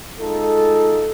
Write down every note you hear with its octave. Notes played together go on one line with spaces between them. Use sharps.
G#3 D#4 F4 A4